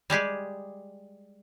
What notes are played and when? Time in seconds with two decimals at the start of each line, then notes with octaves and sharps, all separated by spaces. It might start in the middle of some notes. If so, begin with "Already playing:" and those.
0.10 G3 G#3 G4 G#4